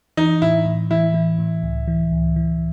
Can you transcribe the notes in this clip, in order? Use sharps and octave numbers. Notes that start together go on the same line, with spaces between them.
E3 D#4
A2 E4
A2
E3 E4
E3
A2
C#2
E3
C#2
E3